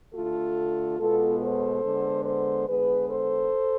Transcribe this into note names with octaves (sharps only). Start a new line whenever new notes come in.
D3 A3 F4 A4
B2 G#3 B3 F4 A4
A4 C5
D3 G#3 B3
A4 C5
D3 G#3 B3 G#4 B4
A4 C5